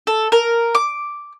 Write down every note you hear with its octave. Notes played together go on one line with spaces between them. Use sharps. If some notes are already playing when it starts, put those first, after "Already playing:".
A4
A#4
D6